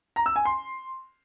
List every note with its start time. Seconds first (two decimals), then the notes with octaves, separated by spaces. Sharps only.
0.16 A#5
0.26 E6
0.36 G#5
0.45 C6